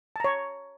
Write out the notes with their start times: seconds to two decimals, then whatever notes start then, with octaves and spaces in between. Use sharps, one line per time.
0.16 A5
0.20 A#5
0.24 C#5